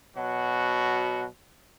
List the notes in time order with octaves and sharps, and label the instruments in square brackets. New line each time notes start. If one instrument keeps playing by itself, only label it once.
[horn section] B2 F#3 F#4